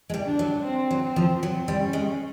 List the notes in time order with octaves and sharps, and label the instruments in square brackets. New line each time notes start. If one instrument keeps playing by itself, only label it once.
[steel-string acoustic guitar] G#3
G3
[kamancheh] D4
[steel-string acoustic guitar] F#3
[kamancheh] C4
[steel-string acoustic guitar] F#3
[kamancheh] C4
[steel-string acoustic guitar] F3
[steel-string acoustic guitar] F#3 [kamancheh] C4
[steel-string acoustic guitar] G3
[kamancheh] C#4
[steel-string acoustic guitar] G#3